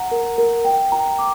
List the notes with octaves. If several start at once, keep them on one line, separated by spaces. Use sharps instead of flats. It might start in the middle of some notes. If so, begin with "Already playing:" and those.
Already playing: F#5 A#5
A#4
A#4
G5
A#5
D6